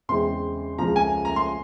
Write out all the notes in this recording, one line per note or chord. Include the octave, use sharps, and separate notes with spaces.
E2 C#3 E3 G#3 C4 C6
C#2 C#3 F3 A#5
G#5
A#5
C6